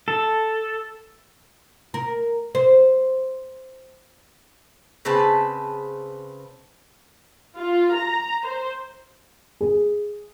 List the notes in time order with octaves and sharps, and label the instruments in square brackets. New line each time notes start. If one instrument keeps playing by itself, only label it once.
[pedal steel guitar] A4
[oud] A#4
C5
[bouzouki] C#3 C4 B4 A5
[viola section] F4
A#5
C5
[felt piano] G#4